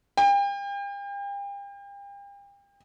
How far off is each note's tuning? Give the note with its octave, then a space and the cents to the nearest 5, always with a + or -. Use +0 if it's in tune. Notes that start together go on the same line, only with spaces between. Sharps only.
G5 +40